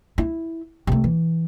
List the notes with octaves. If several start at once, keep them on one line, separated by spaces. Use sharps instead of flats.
E4
C3 A3
E3